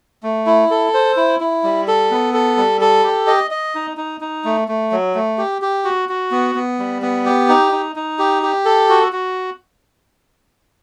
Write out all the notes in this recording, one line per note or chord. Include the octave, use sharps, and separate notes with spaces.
A3
E4
A4
C5
E4
E4
G3
A4
B3
A4
G3
A4
G4
D#5
D#5
D#4
D#4
D#4
A3
A3
F#3
A3
G4
G4
F#4
F#4
B3
B3
G3
B3
G4
D#4
D#4
D#4
G4
G4
A4
F#4
F#4